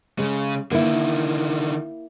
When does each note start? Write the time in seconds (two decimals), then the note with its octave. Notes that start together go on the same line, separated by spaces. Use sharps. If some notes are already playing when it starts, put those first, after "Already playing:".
0.19 C#3 G#3
0.72 D3 D#3 A#3 E4